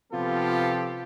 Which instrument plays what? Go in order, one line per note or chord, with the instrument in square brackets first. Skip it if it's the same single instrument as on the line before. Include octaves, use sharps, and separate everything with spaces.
[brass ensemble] C3 F3 B3 F4 G4 A4